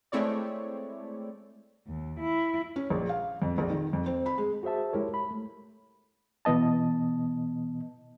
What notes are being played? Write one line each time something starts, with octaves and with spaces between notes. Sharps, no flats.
G#3 A3 C4 E4 C#5 D5
D#2
E4
C#4
A#1
F5
F2
A#1
D#3
F2
C4
B5
G#3
F#4 G#4 C5 E5 A5
G#3 E4 G4 A#4 C#5
B5
A3
B2 E3 B3 D#5 A5